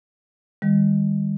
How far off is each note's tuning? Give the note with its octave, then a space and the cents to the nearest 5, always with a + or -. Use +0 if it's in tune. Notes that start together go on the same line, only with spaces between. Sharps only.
D#3 +0 G3 +35